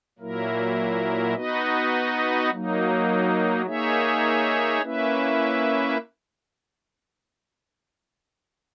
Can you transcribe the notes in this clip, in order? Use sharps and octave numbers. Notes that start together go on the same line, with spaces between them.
A#2 F#3 A#3 E4 A#4
B3 D#4 F#4 B4 D#5
F#3 A#3 D#4
A#3 D#4 G#4 C#5 E5
A#3 C#4 E4 B4 E5